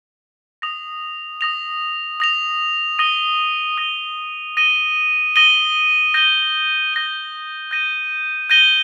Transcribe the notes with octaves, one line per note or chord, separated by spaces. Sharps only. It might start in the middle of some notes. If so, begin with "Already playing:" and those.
D#6 A#6 F7
D#6 A#6 F7
D#6 A#6 F7
D#6 A#6 D#7 G7
D#6 A#6 D#7 G7
D#6 A#6 D#7 G7
D#6 A#6 D#7 G7
G6 A#6 D#7 G7
G6 A#6 D#7 G7
G6 A#6 D#7 G7
G6 A#6 D#7 G7